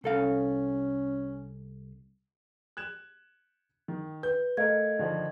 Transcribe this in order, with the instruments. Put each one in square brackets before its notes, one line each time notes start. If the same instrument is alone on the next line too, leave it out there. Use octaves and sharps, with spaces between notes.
[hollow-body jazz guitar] C2 A4 F5 [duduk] C#4
[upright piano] F#6 G#6 E7
D#3
[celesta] B4 [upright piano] G6
[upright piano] A3 A#4 [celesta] D#5 F5 G#6
[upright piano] D3 D#3 F3